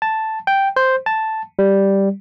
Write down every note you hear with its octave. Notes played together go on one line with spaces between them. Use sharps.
A5
G5
C5
A5
G3